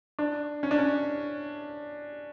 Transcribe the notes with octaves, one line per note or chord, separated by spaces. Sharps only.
D4
C#4
D4
C#4